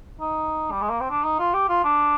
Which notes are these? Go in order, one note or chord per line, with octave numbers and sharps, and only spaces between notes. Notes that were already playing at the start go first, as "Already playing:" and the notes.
D#4
G3
G#3
A#3
C4
D4
D#4
F4
G4
F4
D4